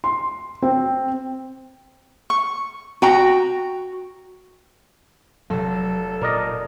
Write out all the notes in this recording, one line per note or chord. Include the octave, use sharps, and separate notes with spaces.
C6
C4
C#6
F#4 G5 A#5
F1 F#3 A4
A#2 A#4 D5 D#5